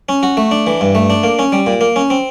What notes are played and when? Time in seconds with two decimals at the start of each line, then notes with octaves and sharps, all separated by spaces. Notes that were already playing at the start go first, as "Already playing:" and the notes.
0.09 C#4
0.23 F#4
0.37 A3
0.51 D4
0.67 E3
0.81 G2
0.95 A3
1.10 D4
1.23 A#3
1.39 C#4
1.52 G3
1.66 A#2
1.81 A#3
1.96 C#4
2.10 C4